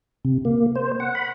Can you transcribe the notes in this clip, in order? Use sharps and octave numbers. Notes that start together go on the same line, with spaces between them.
C3
A#3
C5
F#5
B5